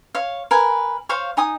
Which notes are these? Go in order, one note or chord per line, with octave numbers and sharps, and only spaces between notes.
C#5 F5
A#4 B4 G#5
C5 C#5 F5 C#6
D#4 G#5 D#6